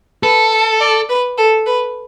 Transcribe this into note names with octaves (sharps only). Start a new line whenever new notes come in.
A4 B4
A5
D5
B4
A4
B4